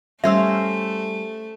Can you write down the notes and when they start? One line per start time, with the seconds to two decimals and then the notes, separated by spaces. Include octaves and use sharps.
0.24 G3 A3 C#4 C5 E5 F5 E6